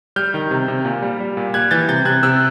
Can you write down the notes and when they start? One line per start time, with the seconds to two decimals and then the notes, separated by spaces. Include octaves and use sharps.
0.16 G3 F6 G6
0.34 D#3
0.51 C3
0.68 C3
0.85 A#2
1.03 G3
1.20 G3
1.37 A#2
1.54 G3 F#6 G#6
1.71 E3 G6 A6
1.89 C3 G6 A6
2.05 C3 F#6 G#6
2.23 C3 E6 F#6